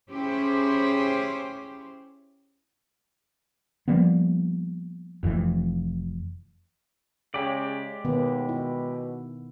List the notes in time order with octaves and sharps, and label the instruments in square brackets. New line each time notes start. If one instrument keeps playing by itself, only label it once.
[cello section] C#4 E4 G4 G#4 C5
[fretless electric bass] F3 G3 A#3 B3
F1 F2 A2 E3
[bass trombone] C#3 [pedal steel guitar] G#3 G4 D5
[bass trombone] D#2 [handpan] B2 D#3 B3
[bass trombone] B2 [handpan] E4